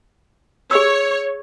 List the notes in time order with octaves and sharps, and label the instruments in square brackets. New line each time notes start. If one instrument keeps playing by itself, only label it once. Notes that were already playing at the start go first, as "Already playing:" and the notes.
[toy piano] G#4 E6 [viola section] C#5